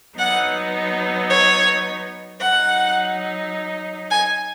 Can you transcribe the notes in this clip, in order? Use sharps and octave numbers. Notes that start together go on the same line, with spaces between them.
F#3 B3 D#4 F#5
C#5
F#3 D#4 F#5
G#5